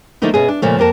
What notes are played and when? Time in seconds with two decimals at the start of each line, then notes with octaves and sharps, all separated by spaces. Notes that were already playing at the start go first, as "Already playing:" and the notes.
0.22 D3 F3 A3 A#3 D#4 E4
0.34 B2 C#4 G#4
0.48 D4
0.62 A#2 C#3 F3 A3
0.79 F2 A#3 A#4 A5